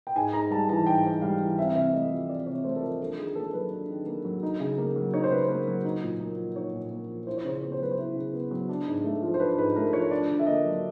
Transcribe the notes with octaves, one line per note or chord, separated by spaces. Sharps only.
G5
G#2 G#5
G#2 A#5
G3 A5
E3 A5
G#2 G5
G#2
G3 F5
E3
C4 E5
F5
C3 E5
A3 D#5
F3
C4 D5
C3 C#5
A3 C5
A4
F3 A#4
D4 A4
D#3 G#4
A#3 A4
F#3 B4
D4
D#3
A#3
F#3
D#4
C#3
A#3
F#3
D#4 C#5
C5
C#3 B4
C5
A#3
F#3
D#4
A#2
A#3
F3
D#4 C#5
A#2
A#3
F3
E4 C5
C#5
C#3 C5
B3 C#5
C5
F#3 B4
C5
E4
C#3
B3
F#3
D4
G#2
A3
F3
C5
D4 B4
G#2 B4
A3 A#4
F3 C#5
D4 D5
D3
E5
A#3 D#5
F#3